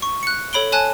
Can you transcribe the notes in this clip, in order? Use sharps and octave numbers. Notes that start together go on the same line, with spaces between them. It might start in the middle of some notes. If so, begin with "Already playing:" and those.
C#6
F#6 C#7
A4 C#5 B5 D7 G7
C#5 G#5 A5 F#6